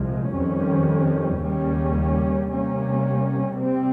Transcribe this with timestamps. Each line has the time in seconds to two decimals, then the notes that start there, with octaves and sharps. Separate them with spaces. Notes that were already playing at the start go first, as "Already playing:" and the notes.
Already playing: C2 A#2 F3 G#3
0.33 F2 D#3 G3 C#4
1.41 D#2 C#3 G3 A#3 C#4
2.49 C3 G3 A#3 C#4
3.57 C3 G3 C4